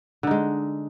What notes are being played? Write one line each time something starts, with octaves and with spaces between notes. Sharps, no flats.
D3 G#3 D#4